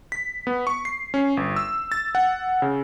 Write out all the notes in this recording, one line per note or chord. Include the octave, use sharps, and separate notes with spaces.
B6
B3
C#6
C7
C#4
G1
E6
A6
F#5
C#3